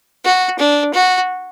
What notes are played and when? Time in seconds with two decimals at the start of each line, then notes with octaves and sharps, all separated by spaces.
0.25 F#4
0.59 D4
0.94 F#4